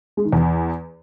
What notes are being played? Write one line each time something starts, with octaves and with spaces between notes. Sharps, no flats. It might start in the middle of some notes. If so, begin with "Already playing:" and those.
G#3
D#3
E2